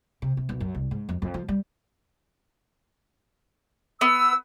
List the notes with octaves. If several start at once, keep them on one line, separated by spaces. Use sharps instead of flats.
C3
C3
B1
F#2
C2
G#2
F2
F2
F3
G3
B3 E6